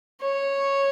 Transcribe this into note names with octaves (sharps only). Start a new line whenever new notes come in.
C#5